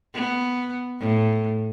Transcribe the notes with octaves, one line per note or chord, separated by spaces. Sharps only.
B3
A2